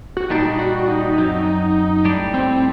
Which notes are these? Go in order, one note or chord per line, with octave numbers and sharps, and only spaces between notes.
F#4
A#2 G3 D4 D#4
F#4
D#4
F#2 F#3 C4 D#4
A2 G3 D4 G4
C4